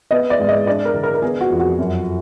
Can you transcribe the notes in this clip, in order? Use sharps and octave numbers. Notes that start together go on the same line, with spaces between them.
B3 D#5
D5
G#2
D#5
D4 D5
A#4
D3
A#4
A#4
B3 G#4
F#4
F2
F#4
F#2